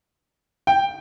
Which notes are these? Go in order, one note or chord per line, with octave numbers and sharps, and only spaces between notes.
G5